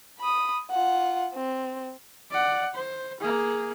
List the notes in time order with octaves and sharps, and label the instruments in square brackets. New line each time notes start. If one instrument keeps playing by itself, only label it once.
[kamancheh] B5 D#6
F4 F#5
C4
[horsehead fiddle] D5 F#5
C5
A#3 G#4